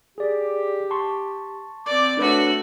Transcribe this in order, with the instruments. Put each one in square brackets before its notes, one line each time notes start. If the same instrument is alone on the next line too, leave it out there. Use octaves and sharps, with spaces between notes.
[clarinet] G4 [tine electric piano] G#4 D5
[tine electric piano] A5 C6 C#6
[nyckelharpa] C4 D5 [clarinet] D6
[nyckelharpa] A3 F#4 [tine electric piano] D4 B4 C#5